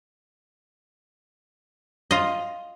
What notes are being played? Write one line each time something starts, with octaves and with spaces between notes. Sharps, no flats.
F4 D#5